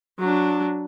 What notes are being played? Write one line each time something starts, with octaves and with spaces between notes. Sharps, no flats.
F#3 D4